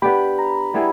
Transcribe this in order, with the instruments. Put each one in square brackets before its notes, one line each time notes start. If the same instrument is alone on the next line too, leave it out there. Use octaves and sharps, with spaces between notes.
[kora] B3 D4 G4 [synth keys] B5
[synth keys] A#5
[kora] G3 B3 E4 G#4